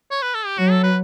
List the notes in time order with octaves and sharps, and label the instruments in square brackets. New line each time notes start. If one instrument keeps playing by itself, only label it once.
[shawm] C#5
B4
A4
G4
[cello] F#3 [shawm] F#4
[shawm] A4
B4